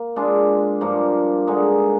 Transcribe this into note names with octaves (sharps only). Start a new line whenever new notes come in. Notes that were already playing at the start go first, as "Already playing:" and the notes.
Already playing: A#3
G#3 D4 F4
G2 F3 A#3
D3 G#3 D#4